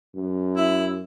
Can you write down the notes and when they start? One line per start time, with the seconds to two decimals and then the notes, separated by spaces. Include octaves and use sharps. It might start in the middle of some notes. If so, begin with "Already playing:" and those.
0.15 F#2
0.56 E4